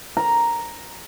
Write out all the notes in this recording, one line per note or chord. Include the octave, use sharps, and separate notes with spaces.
A#5